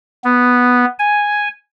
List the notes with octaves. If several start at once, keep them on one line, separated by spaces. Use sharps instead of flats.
B3
G#5